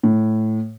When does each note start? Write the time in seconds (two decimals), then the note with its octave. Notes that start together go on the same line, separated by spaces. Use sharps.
0.03 A2